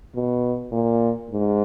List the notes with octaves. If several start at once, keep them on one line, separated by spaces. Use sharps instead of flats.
B2
A#2
G#2